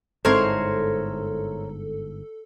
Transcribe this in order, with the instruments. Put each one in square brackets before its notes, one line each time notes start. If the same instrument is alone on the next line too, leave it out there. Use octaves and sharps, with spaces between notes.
[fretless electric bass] G1 G#2 [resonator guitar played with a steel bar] C4 E4 C5 [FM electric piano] A4 [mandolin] A#4 C#5